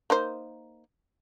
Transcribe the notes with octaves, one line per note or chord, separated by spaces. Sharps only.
A#3 D#4 C5